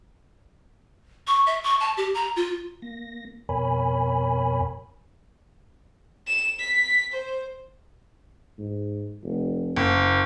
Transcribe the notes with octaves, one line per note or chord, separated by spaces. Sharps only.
C#6
E5
C#6
A5
G4
A#5
F4
A#3 A#6
F2 B2 A#4 C#5 G#5 B5
E7
B6
C5
G#2
F1
F#1 A#3